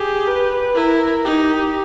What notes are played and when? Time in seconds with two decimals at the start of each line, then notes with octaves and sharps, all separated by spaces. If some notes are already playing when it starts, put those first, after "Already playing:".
Already playing: G4 G#4
0.27 B4
0.76 E4 A#4
1.25 D#4 G4